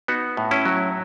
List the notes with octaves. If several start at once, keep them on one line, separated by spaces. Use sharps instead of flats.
B3 D#4 F#4
A2
C#4 E4
F#3